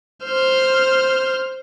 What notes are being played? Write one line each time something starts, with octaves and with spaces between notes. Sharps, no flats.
C5 F6